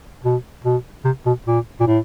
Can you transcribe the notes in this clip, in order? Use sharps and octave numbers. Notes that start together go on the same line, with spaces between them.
B2
B2
C3
B2
A#2
A#2
A2